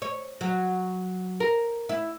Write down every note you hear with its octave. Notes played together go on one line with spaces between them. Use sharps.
C#5
F#3
A#4
E4